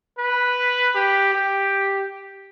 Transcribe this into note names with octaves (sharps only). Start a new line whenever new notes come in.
B4
G4
G4